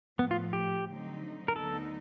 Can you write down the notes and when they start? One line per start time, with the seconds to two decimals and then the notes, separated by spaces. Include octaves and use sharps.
0.19 A2 F3 A3 B3
0.31 F4
0.53 G4
0.88 D3 F#3 A3 C4 D#4
1.48 A#4
1.56 D2 D3 F#3 B3 D#4 A4